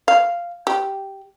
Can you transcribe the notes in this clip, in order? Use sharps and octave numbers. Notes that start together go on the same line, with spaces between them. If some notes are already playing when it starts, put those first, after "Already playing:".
F5
G4